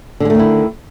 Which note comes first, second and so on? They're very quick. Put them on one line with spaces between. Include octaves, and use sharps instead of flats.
D3 G#3 A3 D#3 E4